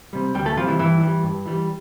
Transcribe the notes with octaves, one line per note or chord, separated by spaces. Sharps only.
C3 G3
D2 G3 G4
A3 A4
C3 F3 G3 F4
E3 E4
G2 E3 E4
E3 G3
G2
E3 G3